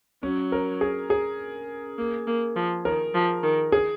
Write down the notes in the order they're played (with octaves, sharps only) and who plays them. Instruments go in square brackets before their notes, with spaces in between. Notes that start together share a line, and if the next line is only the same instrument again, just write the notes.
[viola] F#3 [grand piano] C#4
[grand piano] A#4
G#4
G#4
[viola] A#3
A#3
F3
[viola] D#3 [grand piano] A#4
[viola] F3
D#3
[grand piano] G#4